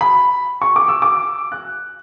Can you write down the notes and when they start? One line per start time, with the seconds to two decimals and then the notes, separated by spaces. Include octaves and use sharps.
0.01 B5
0.62 C#6
0.76 D6
0.88 E6
1.02 D6
1.52 F#6